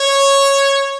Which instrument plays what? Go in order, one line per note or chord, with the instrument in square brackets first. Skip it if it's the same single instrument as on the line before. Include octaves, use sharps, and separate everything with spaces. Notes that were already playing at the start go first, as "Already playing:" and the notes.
Already playing: [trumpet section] C#5